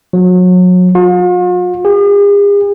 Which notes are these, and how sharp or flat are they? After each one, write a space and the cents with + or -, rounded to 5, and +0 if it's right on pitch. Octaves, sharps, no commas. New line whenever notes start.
F#3 -30
F4 +45
G#4 -45